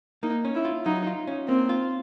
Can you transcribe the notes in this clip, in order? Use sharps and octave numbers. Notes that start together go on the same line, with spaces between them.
A#3 D#4
C#4
E4
F4
F#3 D#4
F4
C#4
A#3 C4
F4